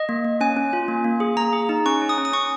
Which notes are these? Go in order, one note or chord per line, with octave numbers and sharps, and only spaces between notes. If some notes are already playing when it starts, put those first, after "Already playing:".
Already playing: D#5
A#3
A#3
C#4 G#5
C#4
F4
A#3
A#3
G#4
A#3 A#5
G#4
D#4
C#4 C#6
C#4
D#6
C#4
D#6
C#4 C#6